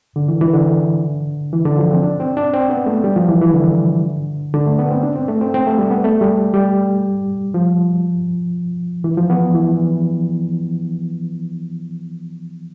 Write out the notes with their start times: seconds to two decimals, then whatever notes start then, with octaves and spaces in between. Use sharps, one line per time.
0.16 D3
0.28 E3
0.41 E3
0.54 D3
1.53 E3
1.65 D3
1.78 F3
1.91 C4
2.03 D4
2.20 C4
2.37 D4
2.54 C4
2.70 B3
2.86 A3
3.04 G3
3.16 F3
3.28 E3
3.41 E3
3.54 D3
4.54 D3
4.66 A3
4.78 B3
4.91 C4
5.03 D4
5.16 C4
5.28 A3
5.41 C4
5.54 C4
5.67 A3
5.78 G3
5.91 B3
6.04 A3
6.21 G3
6.54 G3
7.54 F3
9.04 E3
9.17 F3
9.30 B3
9.54 E3